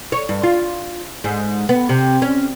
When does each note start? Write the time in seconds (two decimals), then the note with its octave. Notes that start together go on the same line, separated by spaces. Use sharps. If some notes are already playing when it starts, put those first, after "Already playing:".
0.12 C#5
0.29 G2
0.43 F4
1.24 G#2
1.69 B3
1.89 C3
2.22 C#4